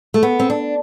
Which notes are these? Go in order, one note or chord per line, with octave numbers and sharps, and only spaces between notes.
A3
B3
C4
D4